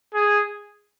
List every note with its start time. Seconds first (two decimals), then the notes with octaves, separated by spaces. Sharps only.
0.14 G#4